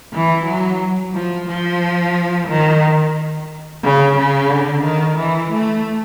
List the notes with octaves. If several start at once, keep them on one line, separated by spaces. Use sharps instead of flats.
E3
F#3
F3
F3
D#3
C#3
C#3
D3
D#3
E3
A3